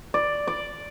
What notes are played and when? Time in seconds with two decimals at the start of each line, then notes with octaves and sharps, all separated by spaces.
0.14 D5
0.47 D5